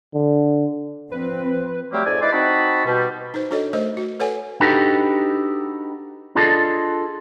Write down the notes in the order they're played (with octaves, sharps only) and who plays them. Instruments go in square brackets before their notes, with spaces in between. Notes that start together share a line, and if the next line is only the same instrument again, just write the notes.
[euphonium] D3
[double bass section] F3 C4 [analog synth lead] B4
[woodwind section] F#3 G3 A3 A#3 C4 G4
F2 G#2 D5 G#5
D#4 E4 B4 C5 D5
C4 D#4 F#4 F#5 A5 B5
B2 G3
[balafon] D#4 C5
D4 F#4 A4 C#5 D#5
A3 A#4 C5 D#5
F#4
A4 B4 C#5 F#5 G#5
[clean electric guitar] D4 D#4 F#4 G4 A4 B4
D4 F4 G#4 A4 D5 D#5